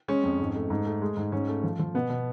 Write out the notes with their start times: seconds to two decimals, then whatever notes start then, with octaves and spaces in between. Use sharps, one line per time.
0.08 G#3 C#4
0.24 F2
0.40 G#2
0.56 A3
0.70 G#2
0.86 A3
1.02 G#3
1.17 G#2
1.32 G#2 C#4
1.48 A3
1.63 F3
1.79 F3
1.94 B2 B3
2.10 B2